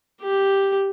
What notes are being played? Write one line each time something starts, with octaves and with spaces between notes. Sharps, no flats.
G4